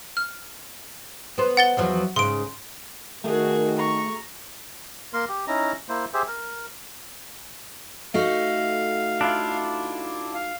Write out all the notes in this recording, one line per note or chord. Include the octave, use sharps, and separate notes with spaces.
F6
B3 C5
F#5 A6 G7
E2 F3 F#3
G#2 C#3 C6 D7
D#3 A3 F#4 G#4 A#4
A#5 C#6
A#3 A#4 C6
G4
C#4 D#4 E4 A#5
A#3 E4 C5
G4 G#4 C5 E5
A#4
A3 D#4 F#4 F5
D4 E4 F4
F5